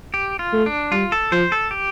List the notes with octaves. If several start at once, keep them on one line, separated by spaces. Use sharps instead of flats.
G4
F4
A3
D4
G3 F4
A4
F3 C5
A4
G4